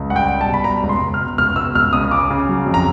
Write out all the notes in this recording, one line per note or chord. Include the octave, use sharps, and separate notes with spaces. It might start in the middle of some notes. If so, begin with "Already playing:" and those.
Already playing: C#2
G3 F#5
G5
G3
A5
B2
B5
G3 A#5
C#2
C6
C#2
F6
B2
C#2 F6
B2 E6
C#2 F6
C#2 D#6
C#3 D6
C#3
F#3
F2
A#5